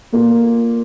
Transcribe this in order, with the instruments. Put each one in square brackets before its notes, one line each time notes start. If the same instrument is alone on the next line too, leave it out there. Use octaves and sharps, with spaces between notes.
[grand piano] A#2 A#3 F4